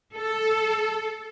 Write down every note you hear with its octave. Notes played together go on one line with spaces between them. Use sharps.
A4